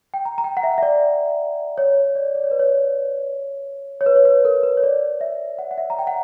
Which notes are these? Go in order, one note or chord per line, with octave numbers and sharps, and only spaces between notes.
G5
A#5
A#5
G5
F#5
E5
E5
D5
C#5
D5
D5
C#5
B4
C#5
C#5
B4
C#5
B4
A#4
B4
C#5
D5
E5
F#5
F#5
E5
A#5
G5
F#5